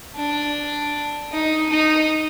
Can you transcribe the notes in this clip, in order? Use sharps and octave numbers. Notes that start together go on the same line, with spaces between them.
D4
D#4
D#4